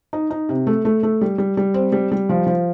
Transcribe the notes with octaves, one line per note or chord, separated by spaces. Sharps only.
D#4
D#4
C3
A3
A3
A3
G3
G3
G3
C4
G3
G3
F3
F3